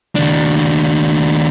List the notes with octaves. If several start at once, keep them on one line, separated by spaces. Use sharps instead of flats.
D#2 D4